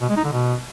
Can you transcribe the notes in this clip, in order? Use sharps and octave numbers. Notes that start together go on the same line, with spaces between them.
B2
G#3
D#4
D3
B2